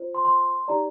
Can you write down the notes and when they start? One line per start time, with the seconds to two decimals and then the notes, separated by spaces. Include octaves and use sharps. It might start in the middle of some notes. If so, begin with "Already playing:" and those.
Already playing: F4 C5
0.15 C6
0.25 C6
0.68 D#4 G4 D5 A#5